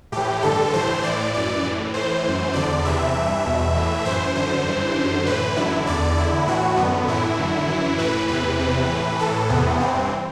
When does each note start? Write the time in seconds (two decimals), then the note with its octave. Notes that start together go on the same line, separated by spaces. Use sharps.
0.12 A2 E3 G4
0.42 G2 D3 A4
0.73 A2 E3 C5
1.03 A2 E3 D5
1.33 F#2 E3 D5
1.64 A2 E3
1.94 A2 E3 C5
2.24 F#2 E3
2.54 E2 D3 D5
2.84 E2 C3 E3 E5
3.15 G2 E3
3.45 E2 B2
3.75 A2 E3
4.05 F#2 E3 C5
4.35 F#2 D3 C5
4.66 G2 E3
4.96 F#2 D3
5.26 A2 E3 B4
5.56 F#2 D3 E4
5.87 E2 D3 D5
6.17 E2 D3 E4
6.47 A2 E3 F#4
6.77 F#2 D3 B3
7.08 A2 E3 E4
7.37 F#2 D3
7.67 F#2 E3
7.98 A2 E3 B4
8.28 E2 C3 E3 B4
8.58 E2 C3 E3
8.89 A2 E3
9.19 A2 E3 A4
9.49 E2 C3 E3 B3
9.79 G2 E3 C4